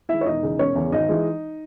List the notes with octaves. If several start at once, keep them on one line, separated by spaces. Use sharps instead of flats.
D#3 G#3 E4 E5
C#5
E1 D#4 D#5
E2 C#3
E1 C#4 C#5
E2 C#3
G#1 D#4 D#5
E3 G#3